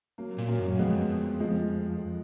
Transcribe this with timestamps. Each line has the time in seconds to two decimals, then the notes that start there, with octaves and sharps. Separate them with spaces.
0.18 F#3 A#3
0.39 A#2
0.48 F#3 A#3
0.59 F#2
0.79 F2 G#3 B3
1.40 F3 G#3